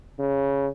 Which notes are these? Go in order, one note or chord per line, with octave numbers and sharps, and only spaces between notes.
C#3